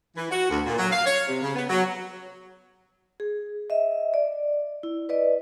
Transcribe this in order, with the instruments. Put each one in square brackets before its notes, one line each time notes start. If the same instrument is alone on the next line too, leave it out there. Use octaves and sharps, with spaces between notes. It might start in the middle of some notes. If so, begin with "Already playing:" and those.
[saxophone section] E3
F#4
D2
A#2
F#3
F5
C#5
C3
C#3
B3
F#3
[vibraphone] G#4
D#5 E5
D5
E4
B4 D5 D#5